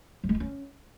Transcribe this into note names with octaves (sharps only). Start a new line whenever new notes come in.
F3
G#3
F4
C#4